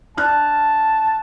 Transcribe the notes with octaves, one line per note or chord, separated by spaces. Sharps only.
D4 A5 F6 F#6